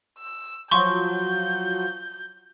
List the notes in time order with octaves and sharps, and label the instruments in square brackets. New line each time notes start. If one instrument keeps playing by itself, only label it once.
[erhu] E6
[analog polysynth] F3 F#3 [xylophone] C6 C#6 [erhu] G6